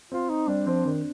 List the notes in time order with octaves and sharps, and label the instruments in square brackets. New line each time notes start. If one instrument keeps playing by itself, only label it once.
[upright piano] C4 [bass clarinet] F4
[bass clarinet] D#4
[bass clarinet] G3 [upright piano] D4
[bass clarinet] F3 [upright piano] C4
[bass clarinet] D#3 [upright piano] D4